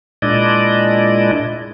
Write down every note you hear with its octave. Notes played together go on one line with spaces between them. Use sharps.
A#2 G#3 D4 E4 D5 D#5